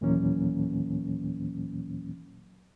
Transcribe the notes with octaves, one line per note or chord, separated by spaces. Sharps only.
D#2 A#2 E3 F#3 A#3 C#4